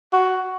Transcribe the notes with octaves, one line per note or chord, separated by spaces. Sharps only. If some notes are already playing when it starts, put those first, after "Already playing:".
F#4